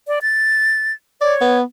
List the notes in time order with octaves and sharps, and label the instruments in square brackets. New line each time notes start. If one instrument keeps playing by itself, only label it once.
[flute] D5
A6
[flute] C#5 [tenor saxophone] D5
[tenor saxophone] B3